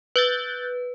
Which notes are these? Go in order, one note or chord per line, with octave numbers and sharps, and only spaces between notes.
B4 F#6 G6 A6